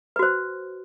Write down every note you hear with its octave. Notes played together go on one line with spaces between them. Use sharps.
F#4 B4 C5